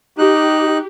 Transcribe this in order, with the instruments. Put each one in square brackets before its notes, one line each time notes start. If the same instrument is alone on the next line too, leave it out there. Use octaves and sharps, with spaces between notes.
[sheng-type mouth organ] D#4 F#6 [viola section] G4